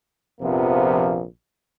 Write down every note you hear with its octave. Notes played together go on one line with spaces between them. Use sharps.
A#1 F2 C3 F3 A#3 B3